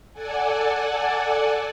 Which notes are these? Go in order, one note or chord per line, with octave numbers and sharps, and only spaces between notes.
A4 D5 F#5 G#5